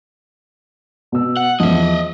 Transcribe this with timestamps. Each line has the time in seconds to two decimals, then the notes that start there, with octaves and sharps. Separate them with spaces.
1.12 B2 E6
1.37 F#5
1.60 E2 F3 D#5 E5